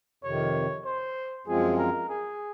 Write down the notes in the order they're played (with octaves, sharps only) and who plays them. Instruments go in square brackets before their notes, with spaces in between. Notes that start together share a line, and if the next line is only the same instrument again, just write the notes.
[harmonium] F2 C3 D#3 [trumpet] C#5
[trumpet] C5
[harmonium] F#2 F3 G#3 C4 F4 [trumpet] G#4
[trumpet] A#4
G#4